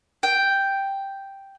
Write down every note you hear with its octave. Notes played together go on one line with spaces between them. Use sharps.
G5